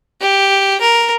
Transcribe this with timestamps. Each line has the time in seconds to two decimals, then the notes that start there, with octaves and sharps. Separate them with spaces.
0.21 G4
0.81 A#4